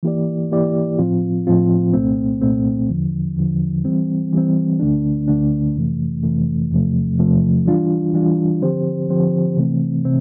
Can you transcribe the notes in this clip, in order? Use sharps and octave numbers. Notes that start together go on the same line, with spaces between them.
E3 A#3 E4 G4 D5
E3 A#3 E4 G4 D5
A2 F3 C4 F4
A2 F3 C4 F4
C2 A#2 A3 C4
C2 A#2 A3 C4
E2 D3 F3
E2 D3 F3
E3 G3 C4
E3 G3 C4
D2 D3 A3 D4
D2 D3 A3 D4
F2 C3 E3 A3
F2 C3 E3 A3
E2 C3 F3 A3
E2 C3 F3 A3
E3 G3 D4 F4
E3 G3 D4 F4
D3 F3 C4 G4 C5
D3 F3 C4 G4 C5
C3 E3 A3 C4
C3 C4